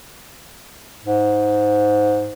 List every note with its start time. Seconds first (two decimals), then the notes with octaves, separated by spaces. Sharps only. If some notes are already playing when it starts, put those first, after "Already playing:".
1.05 G#2